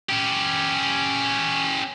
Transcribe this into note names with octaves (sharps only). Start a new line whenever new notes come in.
C#4 G4